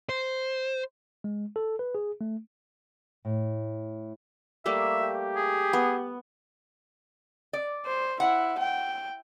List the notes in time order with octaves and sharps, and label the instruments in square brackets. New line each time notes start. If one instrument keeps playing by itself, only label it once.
[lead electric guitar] C5
[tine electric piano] G#3
A4
B4
G#4
A3
[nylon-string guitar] A2
[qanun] G3 A3 A#3 [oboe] E5
[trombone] G4
[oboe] G#4
[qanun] B3
[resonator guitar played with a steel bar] D5
[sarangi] C5
[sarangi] E4 [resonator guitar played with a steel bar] F#5
[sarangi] G5